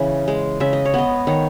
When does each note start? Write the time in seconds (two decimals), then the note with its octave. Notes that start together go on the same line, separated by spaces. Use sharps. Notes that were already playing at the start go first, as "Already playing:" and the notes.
Already playing: C#3 E3
0.28 G#3
0.60 C#3 E5
0.73 D#5
0.85 C#5
0.94 B3 D#5
1.27 D#3 C#5